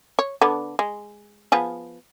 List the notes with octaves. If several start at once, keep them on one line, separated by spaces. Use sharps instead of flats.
C#5
D3 B3 D4
G#3
F3 B3 G#4